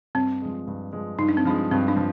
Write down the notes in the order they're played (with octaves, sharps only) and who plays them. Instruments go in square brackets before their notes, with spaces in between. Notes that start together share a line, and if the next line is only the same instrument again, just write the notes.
[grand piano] G2 [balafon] C4
[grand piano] F3 G#3
G2
F3 G#3
[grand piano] G2 [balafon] D#4
[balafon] D4
C4
[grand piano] F3 G#3 [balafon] D4
[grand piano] G2 [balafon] C4
[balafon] D4
[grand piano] F3